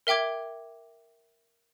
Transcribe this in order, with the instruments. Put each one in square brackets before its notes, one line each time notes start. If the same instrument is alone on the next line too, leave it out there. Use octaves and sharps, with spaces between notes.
[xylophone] A#4 E5 G5 D6 G#6